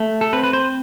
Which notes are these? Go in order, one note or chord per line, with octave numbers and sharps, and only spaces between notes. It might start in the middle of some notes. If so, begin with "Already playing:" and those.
Already playing: A3
A4
C4 B4
B4
C5